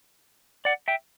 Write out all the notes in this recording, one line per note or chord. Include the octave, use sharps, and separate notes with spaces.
D5 F#5
E5 G5